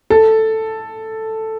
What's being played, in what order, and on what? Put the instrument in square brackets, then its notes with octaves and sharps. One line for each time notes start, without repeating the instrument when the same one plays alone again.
[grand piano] A4